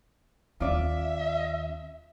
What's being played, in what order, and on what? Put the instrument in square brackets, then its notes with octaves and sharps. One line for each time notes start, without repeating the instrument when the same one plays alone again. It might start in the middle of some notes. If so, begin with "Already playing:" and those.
[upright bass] D#2 C4 [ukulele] F4 D5 [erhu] E5